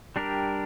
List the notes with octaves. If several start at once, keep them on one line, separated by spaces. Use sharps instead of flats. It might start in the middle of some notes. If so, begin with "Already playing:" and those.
G3 D4 G4 A#4